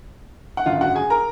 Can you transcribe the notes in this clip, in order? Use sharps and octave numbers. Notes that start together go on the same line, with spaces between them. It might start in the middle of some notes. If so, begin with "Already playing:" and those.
F#5
G#1 F#2 D3 F4 F5
F#4 F#5
G#4 G#5
A#4 A#5